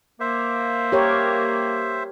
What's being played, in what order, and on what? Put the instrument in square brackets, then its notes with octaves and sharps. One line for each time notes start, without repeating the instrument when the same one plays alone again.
[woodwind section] A#3 [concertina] C5 E5
[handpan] G4 A#4 C#5